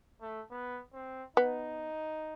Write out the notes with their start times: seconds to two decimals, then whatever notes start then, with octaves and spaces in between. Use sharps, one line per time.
0.22 A3
0.51 B3
0.94 C4
1.37 B3 D#4